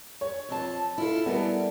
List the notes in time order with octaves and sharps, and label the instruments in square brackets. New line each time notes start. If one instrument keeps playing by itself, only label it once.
[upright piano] C#5
[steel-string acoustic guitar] F2 C4 A5
E4 F4 A4
[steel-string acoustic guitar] G3 A#4 D5 [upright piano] B3 E4 A4